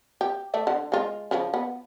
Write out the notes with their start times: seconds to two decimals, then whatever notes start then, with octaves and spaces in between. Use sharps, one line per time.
0.21 G4
0.54 A3 D5 E5
0.67 D3
0.92 G#3 F4
1.31 C#3 F3
1.54 B3